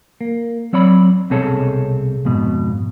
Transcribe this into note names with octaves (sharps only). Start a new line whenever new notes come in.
A#3
F#3 C4 C#5 D5 B5
C2 B2 C4 G#4 A4 C#5
F2 G#2 B2